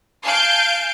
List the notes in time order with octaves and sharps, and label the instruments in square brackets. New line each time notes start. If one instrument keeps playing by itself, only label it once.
[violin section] F5 G#5 A5 G6 D7